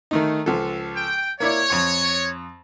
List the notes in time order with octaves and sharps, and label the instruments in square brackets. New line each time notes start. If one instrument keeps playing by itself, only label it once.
[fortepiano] D#3 A3 D#4
C#2 F3 A4
[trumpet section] G5
[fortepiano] A#3 E4 D5 [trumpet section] C#5
[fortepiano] F2 C#6